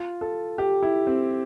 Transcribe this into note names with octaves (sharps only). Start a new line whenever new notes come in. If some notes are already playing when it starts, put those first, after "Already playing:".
Already playing: F4
A4
G4
E4
C4